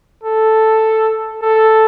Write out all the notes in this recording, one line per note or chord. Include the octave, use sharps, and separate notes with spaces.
A4
A4